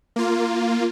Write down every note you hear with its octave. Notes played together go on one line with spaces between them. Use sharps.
A#3 F4